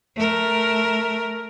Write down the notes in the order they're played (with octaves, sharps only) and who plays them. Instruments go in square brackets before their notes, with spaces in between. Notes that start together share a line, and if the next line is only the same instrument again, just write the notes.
[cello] A3 A#4